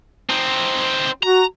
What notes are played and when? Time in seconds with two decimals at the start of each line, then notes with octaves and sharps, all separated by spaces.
0.29 C4 D#4
1.23 F#4 A#5